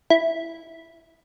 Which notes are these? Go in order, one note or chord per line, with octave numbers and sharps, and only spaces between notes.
E4